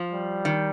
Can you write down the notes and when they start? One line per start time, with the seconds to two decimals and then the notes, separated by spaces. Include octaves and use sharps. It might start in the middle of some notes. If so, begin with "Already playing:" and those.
Already playing: F3
0.13 G3
0.45 D#3